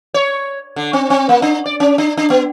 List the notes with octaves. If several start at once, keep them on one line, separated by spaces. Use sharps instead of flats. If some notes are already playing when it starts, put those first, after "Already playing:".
C#5
D3
C4
C4
A#3
D4
D5
C#4
D4
D4
B3